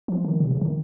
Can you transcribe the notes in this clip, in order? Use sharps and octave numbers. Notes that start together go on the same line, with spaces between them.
F3
D#3
C3
C#3
D#3